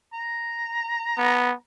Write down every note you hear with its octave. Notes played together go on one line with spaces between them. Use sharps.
A#5
B3